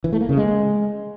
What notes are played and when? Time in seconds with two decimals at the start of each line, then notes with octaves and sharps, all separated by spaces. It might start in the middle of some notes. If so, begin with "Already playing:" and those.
0.04 E3
0.12 A3
0.21 A#3
0.29 C#3
0.37 G#3